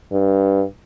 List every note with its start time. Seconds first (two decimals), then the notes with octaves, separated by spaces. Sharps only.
0.12 G2